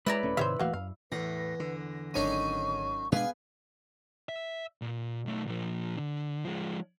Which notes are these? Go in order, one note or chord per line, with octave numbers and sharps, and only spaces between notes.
G#3 E4 B4 D5 A#5
D#1 A3 C#4
G#2 C3 D#3 C5 C#5 E5 F5
D1 E3 A3 A#3 F#4 F5
F#2 F5
E2 A2 B4 A#6
D3
G#1 F#2 D4 D#4 C#5 C#6 D#7
B2 G#3 B3 D4 G#4 F5 G#5
E5
A#2
B1 A3
A#2 F3
D3
F3 G#3